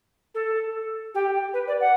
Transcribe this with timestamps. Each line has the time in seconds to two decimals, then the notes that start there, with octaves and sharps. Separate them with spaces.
0.34 A4
1.14 G4
1.53 B4
1.67 D5
1.80 F#5